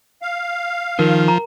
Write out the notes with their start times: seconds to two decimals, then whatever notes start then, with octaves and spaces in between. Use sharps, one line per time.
0.22 F5
0.99 D#3 F3 A#4
1.28 A#5